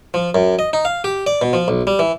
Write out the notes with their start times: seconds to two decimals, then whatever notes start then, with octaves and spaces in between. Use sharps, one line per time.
0.14 F3
0.35 F#2
0.59 D#5
0.73 D#4
0.85 F5
1.04 G4
1.27 D5
1.42 B2
1.53 F3
1.68 B1
1.87 G3
1.99 E3